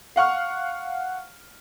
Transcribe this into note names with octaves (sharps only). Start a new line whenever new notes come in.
F5 F#5 C#6 F6